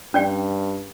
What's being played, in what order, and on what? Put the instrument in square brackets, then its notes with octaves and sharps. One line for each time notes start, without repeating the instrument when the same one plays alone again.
[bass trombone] G2 [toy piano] C#4 D5 G5